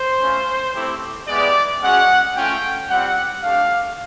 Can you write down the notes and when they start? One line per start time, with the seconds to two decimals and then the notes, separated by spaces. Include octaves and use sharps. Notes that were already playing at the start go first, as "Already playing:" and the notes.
Already playing: C5
0.20 A3 C#4 F4
0.74 A3 C4 E4 G4
1.27 G#3 B3 E4 G4 D5
1.81 G#3 C#4 F#4 F#5
2.35 A3 C#4 F4 G5
2.89 G3 C4 F4 F#5
3.43 A3 D4 G4 F5